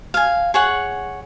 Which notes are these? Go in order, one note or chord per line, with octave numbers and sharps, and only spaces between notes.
F5 G#5
G#4 C#5 F#5